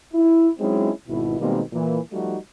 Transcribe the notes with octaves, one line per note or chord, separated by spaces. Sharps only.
E4
F#3 G#3 C4 C#4 D#4 E4
G#1 B2 E4
B2 D#3 G3 G#3 A#3 C4
A#2 E3
F3 G3 A3 D#4 F#4